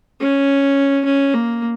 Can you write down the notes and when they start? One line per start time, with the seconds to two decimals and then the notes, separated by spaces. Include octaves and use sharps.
0.20 C#4
1.05 C#4
1.34 A#3